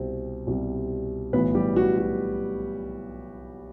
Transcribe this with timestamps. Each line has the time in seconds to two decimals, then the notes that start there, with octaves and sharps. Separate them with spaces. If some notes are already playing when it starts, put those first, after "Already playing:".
Already playing: C2 B2 G3 C4
0.47 C2 B2 G3
1.33 B1 A2 E3 B3 B4
1.55 G3 G4
1.76 F#4
1.98 F#4